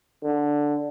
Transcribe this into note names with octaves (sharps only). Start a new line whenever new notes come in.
D3